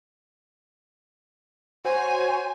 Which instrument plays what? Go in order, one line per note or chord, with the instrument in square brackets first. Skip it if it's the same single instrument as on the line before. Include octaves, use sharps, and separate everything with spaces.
[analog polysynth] F#4 C5 C#5 [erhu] G#5